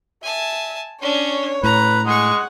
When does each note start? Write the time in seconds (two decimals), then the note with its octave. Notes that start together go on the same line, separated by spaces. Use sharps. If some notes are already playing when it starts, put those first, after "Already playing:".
0.24 E5 G#5 A5
1.01 C#4 D4 C#5
1.63 A2 B4 A#5
2.06 G#3 G#4 F#5 C#6